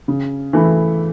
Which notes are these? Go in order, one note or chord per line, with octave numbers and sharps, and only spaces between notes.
C#3
E3 A3 E4